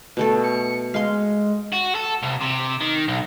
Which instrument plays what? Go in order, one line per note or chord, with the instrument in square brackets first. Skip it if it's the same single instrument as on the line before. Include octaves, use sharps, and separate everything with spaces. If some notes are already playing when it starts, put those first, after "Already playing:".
[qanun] B2 A3 A4
[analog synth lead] C#7
[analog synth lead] G#3 [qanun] F5 C6
[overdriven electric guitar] F#4
A4
C2
C3
D#3
B1